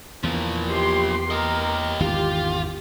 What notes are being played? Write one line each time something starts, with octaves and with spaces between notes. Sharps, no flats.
E2 E3 F3 A#3
G4 C6
G4 A#4 D#5
G#1 E2 D#3 F4 G4